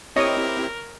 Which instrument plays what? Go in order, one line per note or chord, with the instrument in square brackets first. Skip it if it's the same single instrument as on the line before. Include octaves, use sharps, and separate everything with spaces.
[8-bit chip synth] C4 E4 G4 [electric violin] A#4 [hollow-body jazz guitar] C#5 [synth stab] D#5 D#6